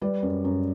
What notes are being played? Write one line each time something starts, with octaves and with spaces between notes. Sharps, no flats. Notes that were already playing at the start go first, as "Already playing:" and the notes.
G3 B4 D5
F#2
F#2